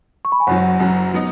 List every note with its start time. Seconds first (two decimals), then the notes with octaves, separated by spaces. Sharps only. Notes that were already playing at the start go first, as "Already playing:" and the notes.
0.25 C#6
0.32 B5
0.40 G#5
0.47 F#1 F#2 F#3 C#5 F#5
0.79 F#1 F#2 F#3
1.14 F#3 B3 D#4